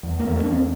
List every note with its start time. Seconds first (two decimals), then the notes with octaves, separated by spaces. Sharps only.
0.03 E2
0.19 A#3
0.24 E2 A3
0.36 A#3
0.43 E2 D4
0.51 C4